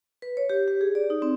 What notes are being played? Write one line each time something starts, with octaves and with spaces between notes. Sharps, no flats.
B4
C#5
G4
G4
G#4
D5
D#4
C4